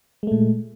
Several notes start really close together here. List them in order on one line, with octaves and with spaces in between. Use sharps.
G#3 A3 A#2